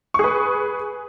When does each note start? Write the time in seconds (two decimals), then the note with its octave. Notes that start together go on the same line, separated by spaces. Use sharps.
0.14 C#6
0.19 G#4
0.24 B4